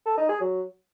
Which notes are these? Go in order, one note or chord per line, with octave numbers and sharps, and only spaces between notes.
A4
D#4
G#4
F#3